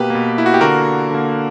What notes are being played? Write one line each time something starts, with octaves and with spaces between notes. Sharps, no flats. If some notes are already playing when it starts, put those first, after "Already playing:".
Already playing: B2 A#3 G4 B4
B2 A#3
E4
F#4
G4
D3 A#3 F#4 A#4
D3 A#3